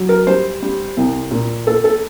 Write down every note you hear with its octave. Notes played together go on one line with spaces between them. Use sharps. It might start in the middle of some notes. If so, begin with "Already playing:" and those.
Already playing: F#3
A#4
G3 C5
G3
C2
A#2
A#3 A4
A4